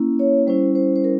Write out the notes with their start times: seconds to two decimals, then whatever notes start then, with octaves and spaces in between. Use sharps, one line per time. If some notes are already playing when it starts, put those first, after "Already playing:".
Already playing: A#3 C#4 E4
0.19 C#5
0.47 G3 C#4 E4 C5
0.75 C5
0.96 C5
1.04 A#4